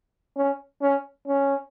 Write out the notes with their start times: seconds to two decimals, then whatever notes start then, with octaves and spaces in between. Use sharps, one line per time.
0.37 C#4
0.82 C#4
1.27 C#4